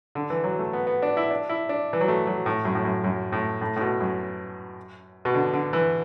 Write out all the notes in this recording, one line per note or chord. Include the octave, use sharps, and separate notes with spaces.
D3
E3
F#3
A3
B3
B3
D4
E4
D4
E4
D4
E3
F#3
A3
F#3
A2
F#2
A2
F#2
F#2
A2
A2
A2
B2
F#2
B2
D3
D3
E3